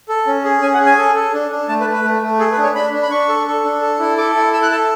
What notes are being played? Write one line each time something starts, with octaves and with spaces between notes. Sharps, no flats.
A4
C#4
G#4
C#4 G#5
F#5
G#4
G#5
A4
A4
D4
D4
A3 A5
B4
A3
B4
A3
A3
G#4 A4
B4
D4
C#5
D4 B5
D4
B5
D4 C#6
A4
A4
D4
A4
E4
A4 D6
E4
A4 E6
F#6
A4 A5